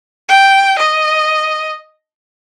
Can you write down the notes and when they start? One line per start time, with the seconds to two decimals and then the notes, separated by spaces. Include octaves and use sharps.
0.29 G5
0.79 D#5